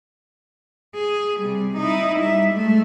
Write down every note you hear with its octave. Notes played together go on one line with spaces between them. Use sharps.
G#4
C3 G3
D#4 E4
G3 E5
G#3 A3